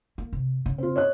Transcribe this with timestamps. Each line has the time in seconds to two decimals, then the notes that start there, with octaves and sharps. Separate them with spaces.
0.18 A#3
0.33 C3
0.66 C#3
0.78 C4 F4
0.96 C#5 D#5 F#6